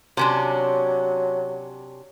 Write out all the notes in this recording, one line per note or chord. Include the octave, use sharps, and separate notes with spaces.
C3 F#3 C#4 D4